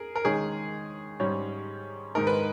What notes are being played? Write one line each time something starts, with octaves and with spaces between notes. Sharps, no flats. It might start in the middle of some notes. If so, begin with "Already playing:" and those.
Already playing: G#4 A#4
A#4
D#3 G#3 C#4 G#4
G#2 G3 C#4
G#2 D#3 G#3 D#4 A#4
B4